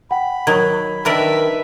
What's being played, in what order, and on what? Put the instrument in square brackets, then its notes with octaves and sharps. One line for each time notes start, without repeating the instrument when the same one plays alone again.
[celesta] F#5 G5 [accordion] B5
[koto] D#3 F#3 [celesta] G#6
[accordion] D#3 [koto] D4 A#4 D5 [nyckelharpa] B4 E5 [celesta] B5 B6